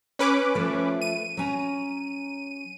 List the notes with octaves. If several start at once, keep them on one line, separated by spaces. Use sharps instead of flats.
C#4 B4 D6
F3 A3
D#7
F#3 C#4 A#5